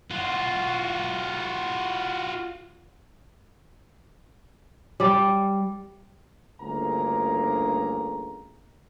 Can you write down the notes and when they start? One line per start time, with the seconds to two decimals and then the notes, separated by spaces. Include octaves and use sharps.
0.11 F4 F#4
5.00 G3 D5
6.61 G1 D2 C#3 A#3 G#4 A#5